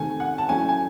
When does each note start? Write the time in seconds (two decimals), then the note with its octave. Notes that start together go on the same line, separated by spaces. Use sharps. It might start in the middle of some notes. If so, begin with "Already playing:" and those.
Already playing: C3 D#3 A3 G#5
0.20 F#5
0.38 A5
0.49 F#3 A3 C#4 E4 G#5
0.69 G#5